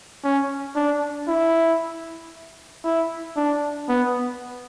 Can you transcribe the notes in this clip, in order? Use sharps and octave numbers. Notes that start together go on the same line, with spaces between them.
C#4
D4
E4
E4
D4
B3